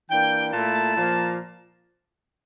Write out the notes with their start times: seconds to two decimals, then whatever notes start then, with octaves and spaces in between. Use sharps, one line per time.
0.10 E3 A#3 D4 G5
0.53 A#2 A3 E4 A5
0.96 A#2 F3 A#3